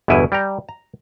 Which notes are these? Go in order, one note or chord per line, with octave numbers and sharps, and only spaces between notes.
G1 E2 B2 E4 G#5
G3 G5 A#5
A#5